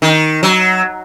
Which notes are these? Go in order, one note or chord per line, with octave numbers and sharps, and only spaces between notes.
D#3
F#3